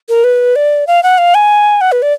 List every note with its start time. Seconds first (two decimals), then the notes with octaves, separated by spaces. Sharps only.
0.09 A#4
0.24 B4
0.56 D5
0.87 F5
1.03 F#5
1.18 F5
1.35 G#5
1.81 F#5
1.92 B4
2.02 D5